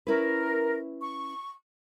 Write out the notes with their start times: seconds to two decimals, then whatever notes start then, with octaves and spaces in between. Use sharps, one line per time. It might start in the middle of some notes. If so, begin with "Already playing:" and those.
0.07 C#4 E4 A#4 B4
1.01 C#6